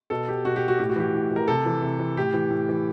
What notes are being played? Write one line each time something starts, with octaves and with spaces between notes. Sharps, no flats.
B2 A4
G4
B2 F#4
G4
F#4
A2 G4
F#4
E3 G4
A2
E3
A#4
C3 A4
E3
C3
E3
A2 G4
E3
A2
E3